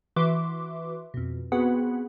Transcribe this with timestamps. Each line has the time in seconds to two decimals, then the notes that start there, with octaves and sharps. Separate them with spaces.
0.16 E3 F#4 B4 E5 C6 D6
1.14 F2 B2
1.52 B3 C4 F#4 G#4 B4 F#5